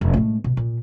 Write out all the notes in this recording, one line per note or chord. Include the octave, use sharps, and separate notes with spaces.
F1
A2 G#3
B2
A#2